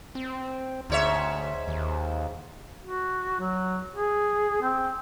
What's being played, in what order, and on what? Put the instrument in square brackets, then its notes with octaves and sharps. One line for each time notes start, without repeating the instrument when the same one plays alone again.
[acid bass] C4
[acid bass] D2 [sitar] G#2 C#5 E5
[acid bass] D#2
[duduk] F#4
F#3
G#4
C4